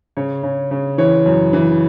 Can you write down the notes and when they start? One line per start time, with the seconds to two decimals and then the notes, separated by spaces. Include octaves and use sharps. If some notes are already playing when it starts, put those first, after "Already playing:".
0.17 C#3 C#5
0.43 C#3
0.71 C#3
0.98 E3 C#5
1.26 F#2
1.53 E3